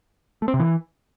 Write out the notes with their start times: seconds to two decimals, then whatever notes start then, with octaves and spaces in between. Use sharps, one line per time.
0.42 A3
0.48 C4
0.54 C3
0.60 E3